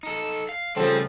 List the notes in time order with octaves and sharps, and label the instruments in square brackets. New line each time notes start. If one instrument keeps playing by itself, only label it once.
[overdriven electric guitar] D#4 A4
F5
[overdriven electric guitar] C#3 G3 [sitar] F3 C4 [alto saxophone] A4